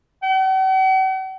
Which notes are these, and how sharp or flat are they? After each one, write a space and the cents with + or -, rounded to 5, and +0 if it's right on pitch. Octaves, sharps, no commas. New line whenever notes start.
F#5 +45